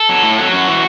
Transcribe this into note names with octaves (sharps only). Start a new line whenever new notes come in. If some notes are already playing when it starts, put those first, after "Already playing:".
Already playing: A4
F#3
A2
F#3
F#2 F#4
E3